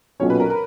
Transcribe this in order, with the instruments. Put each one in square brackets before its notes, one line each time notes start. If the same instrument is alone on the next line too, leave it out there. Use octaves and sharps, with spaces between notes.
[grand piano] B1 A#2 F#3 C#4 [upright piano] C#5
[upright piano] B4
A#4
A#4